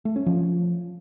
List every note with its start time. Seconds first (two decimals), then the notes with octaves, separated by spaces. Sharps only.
0.05 A3
0.16 C#4
0.26 F3